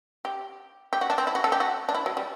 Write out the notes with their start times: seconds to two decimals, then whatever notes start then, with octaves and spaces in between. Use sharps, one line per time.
0.25 G4
0.93 G4
1.01 F#4
1.10 D4
1.18 C4
1.27 E4
1.35 F#4
1.44 A4
1.52 G4
1.60 F#4
1.89 D4
1.95 E4
2.06 F#3
2.17 G3